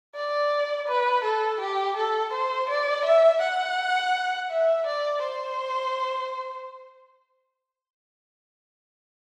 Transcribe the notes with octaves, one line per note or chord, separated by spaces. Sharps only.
D5
B4
A4
G4
A4
C5
D5
E5
F#5
E5
D5
C5